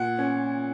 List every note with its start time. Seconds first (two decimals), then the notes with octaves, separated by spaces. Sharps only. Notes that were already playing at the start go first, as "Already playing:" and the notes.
Already playing: A#2 F#5
0.19 C#4